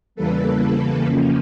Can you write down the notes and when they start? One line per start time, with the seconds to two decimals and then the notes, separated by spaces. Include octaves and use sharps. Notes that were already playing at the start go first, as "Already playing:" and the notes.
0.15 E2 C#3 E3 G3 A#3 A4 B4
1.04 F2 C#3 F3 A#3 C#4